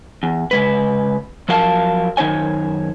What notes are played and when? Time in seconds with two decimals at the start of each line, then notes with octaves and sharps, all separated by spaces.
0.23 E2
0.51 C#3 G#3 B4
1.49 F3 F#3 A#4 F5 A5
2.17 F#2 D#3 D#4 C5 C#5 G#5